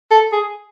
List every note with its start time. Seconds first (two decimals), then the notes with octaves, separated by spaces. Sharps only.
0.11 A4
0.32 G#4